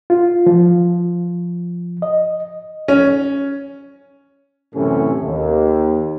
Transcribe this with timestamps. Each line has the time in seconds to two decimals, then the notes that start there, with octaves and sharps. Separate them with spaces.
0.10 F4
0.46 F3
2.02 D#5
2.88 C#4
4.74 F#2 A2 C3 E3 C#4 A4
5.23 D#2